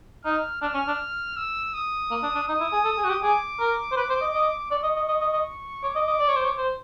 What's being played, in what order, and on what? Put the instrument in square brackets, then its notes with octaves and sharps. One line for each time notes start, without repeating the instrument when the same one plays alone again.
[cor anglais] D#4 [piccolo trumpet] F6
[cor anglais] D4 [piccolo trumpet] F6
[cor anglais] C#4
D4
[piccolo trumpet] E6
D#6
[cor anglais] A#3
D4
D4
[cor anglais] D#4 [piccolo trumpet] D#6
[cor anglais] E4
G#4
A4
G#4
F#4
G4
[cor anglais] G#4 [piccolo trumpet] D6
[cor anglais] A#4
C5
B4
C5
D#5
D#5
[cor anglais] D5 [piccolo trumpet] C#6
[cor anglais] D#5
D#5
D#5
D#5
D#5
[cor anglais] C#5 [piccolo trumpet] D6
[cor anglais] D#5
D#5
D5
C#5
C5
C#5
C5